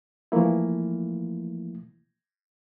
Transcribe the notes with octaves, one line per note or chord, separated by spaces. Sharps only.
E3 F3 A3 A#3 E4